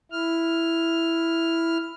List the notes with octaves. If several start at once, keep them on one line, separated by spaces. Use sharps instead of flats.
E4 F6